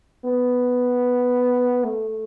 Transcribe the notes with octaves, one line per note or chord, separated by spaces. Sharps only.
B3
A3